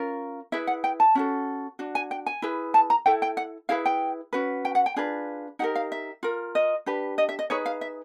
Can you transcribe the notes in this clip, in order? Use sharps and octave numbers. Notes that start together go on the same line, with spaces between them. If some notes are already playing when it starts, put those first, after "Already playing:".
Already playing: C#4 F4 A#4
E4 G#4 B4 E5
F#5
G5
A5
C#4 F#4 A4
D4 F#4
G#5
G5
G#5
E4 G#4 B4
A5
A#5
E4 A4 G5
G5
F#5
E4 G#4 B4 F5
G5
C#4 F#4 B4
G5
F#5
G5
D4 F4 G#4 B4
D#4 G4 A#4 F#5
F5
E5
F4 A#4
D#5
D4 G4 B4
D#5
E5
D#5
D#4 G#4 B4 C#5
F5
E5